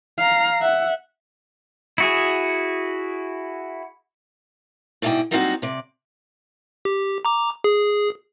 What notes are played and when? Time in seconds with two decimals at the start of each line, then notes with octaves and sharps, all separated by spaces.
0.18 F5 A#5
0.61 E5 F#5
1.98 E4 F#4 G#4
5.02 G#2 B2 E4 D5 D#5 G5
5.31 F#3 G3 A#3 C4 D#4 F#4
5.62 C3 D5
6.85 G4
7.25 A#5 D6
7.64 G#4